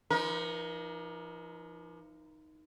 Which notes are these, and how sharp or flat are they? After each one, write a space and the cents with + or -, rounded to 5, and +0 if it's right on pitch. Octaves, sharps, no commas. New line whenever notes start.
F3 -40 D#4 +0 A#4 +35